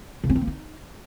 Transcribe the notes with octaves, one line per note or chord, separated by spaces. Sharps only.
C#3
C#4
C4
A#3
D#4